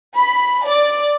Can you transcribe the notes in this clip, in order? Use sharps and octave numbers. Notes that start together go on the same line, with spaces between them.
B5
D5